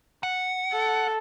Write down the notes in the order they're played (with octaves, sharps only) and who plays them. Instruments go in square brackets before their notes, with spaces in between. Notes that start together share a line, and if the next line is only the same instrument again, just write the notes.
[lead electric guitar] F#5
[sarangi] A4